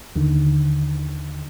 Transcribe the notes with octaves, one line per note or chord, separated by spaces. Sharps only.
D#2 D3 D#3